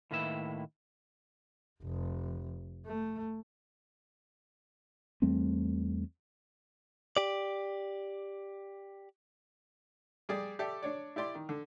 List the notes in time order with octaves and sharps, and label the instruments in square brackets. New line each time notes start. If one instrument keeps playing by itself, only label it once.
[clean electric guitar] A2 D#3 A#3 E4 B4 E5
[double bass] F1
A3
[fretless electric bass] E2 G3 A3 C4
[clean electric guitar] G4 D5
[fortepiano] G3 G#4 D5
G4 A4 D5 E5
D4 C#5 D5
E4 G4 D5 C6
D#3
D3